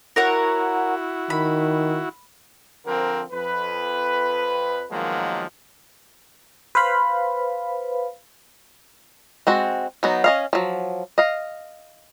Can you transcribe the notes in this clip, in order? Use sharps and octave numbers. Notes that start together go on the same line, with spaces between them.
E4 F#4 A#4 C#5 F#5
D#3 B5
D3 F3 C4 A#4
F2 B4
B2 D#3 F3 F#3 G#3 A#3
B4 C5 F5 B5
G#3 C4 F#4
F#3 B3 D#4
C#4 D#5 F5
F3 F#3
D#5 F5